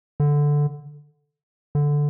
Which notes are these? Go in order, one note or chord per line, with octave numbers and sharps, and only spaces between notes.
D3
D3